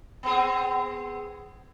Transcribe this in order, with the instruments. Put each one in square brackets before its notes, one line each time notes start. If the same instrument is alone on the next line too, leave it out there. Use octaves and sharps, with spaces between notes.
[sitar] B3 C4 G#4